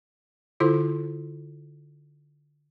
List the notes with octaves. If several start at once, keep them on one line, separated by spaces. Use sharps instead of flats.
D3 E4 F4 A4 C5 C6